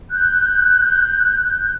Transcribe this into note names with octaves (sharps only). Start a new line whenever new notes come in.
F#6 G6